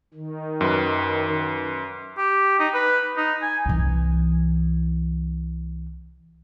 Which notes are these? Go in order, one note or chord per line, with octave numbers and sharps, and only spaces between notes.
D#3
F#2 B4
G4
D#4
B4
D#4
G#5
C2 E3